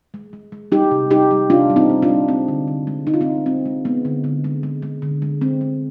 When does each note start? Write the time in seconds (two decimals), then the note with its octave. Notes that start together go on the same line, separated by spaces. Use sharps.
0.14 G#3
0.33 G#3
0.52 G#3
0.72 G3 D#4 G4
0.91 C3
1.10 G3 D#4 G4
1.31 G3
1.50 C3 D4 F4
1.70 G3
1.76 C4 D#4
1.90 G3
2.02 D4 F4
2.09 G3
2.28 G#3 C4
2.48 D3
2.68 D3
2.87 G#3
3.07 G#3 D#4
3.14 F4
3.21 C4 D#4
3.27 D3
3.46 G#3 C4
3.65 G#3
3.85 G#3 B3
4.05 D3
4.24 D3
4.44 G#3
4.63 G#3
4.82 G#3
5.02 D3
5.22 G#3
5.41 G#3 C4
5.61 G#3